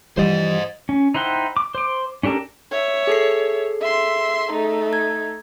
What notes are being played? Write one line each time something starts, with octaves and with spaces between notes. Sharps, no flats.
E3 F3 G3 C5 D#5
C#4
D#4 E4 C5 F#5 G5
D6
C5 D6
C#4 D4 G4 A4 A#4
C#5 E5
G#4 A4 C7
E5 C6
A3 D#4
G#6